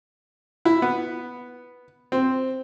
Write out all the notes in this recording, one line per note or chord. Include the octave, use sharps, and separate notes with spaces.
E4
B3
C4